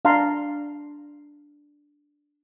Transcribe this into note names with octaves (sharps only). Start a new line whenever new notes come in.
D4 F5 A5 A#5 C6